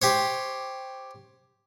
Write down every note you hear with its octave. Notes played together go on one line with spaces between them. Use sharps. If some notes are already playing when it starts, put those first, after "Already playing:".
G4 C5 C#5